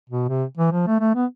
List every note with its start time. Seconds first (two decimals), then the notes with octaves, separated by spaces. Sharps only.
0.10 B2
0.29 C3
0.57 E3
0.72 F3
0.87 A3
1.00 A3
1.15 B3